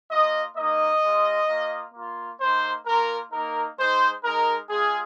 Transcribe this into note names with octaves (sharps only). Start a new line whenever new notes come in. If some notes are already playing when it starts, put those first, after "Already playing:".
A#3 F4 D#5
A#3 D#4 D#5
G#3 F4
A#3 F4
A#3 F4
A#3 D#4 C5
A#3 F4 A#4
A#3 D#4 A#4
G#3 D#4 C5
G#3 D#4 A#4
G#3 C4 F4 G#4